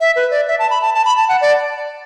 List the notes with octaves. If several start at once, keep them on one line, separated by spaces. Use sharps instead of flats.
E5
B4
D5
E5
A5
B5
A5
A5
B5
A5
F#5
D5